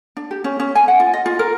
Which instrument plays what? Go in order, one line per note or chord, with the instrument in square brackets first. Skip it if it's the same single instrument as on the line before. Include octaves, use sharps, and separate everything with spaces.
[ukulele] D4
G4
C#4
C#4
G#5
F#5
F4
D#5
F4
A#4